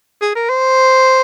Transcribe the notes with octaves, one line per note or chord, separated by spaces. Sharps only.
G#4
A#4
C5